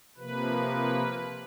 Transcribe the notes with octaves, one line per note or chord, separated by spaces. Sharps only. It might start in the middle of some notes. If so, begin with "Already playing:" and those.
C3 F3 A#3 B4